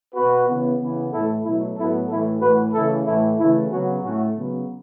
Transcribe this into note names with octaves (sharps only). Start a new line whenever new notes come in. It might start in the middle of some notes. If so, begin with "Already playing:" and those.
B2 B3 F#4 B4
C#3 E3 B3
C#3 E3 B3
A2 E3 A3 E4 A4
B2 F#3 A3 E4
A2 F#3 B3 E4 A4
A2 E3 A3 E4 A4
A2 E3 A3 F#4 B4
C#3 E3 A3 E4 A4
A2 E3 A3 E4
C#3 E3 A3 E4
C#3 F#3 B3 C#4 F#4
A2 A3 C#4 F#4
C#3 F#3 B3